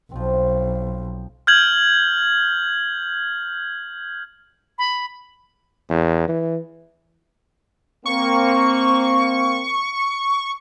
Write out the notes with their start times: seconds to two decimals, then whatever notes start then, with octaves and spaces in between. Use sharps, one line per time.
0.11 B1 F3 C4
1.47 F6 G6 G#6 F#7
4.78 B5
5.90 E2
6.28 E3
8.06 A#3 C4 C#6